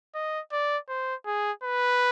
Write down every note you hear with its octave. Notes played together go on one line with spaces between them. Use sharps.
D#5
D5
C5
G#4
B4